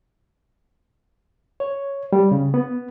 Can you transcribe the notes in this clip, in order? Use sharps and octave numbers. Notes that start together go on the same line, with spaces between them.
C#5
G3
C#3
B3